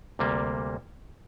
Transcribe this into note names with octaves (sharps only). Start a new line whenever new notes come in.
D2 C3 G3 A#3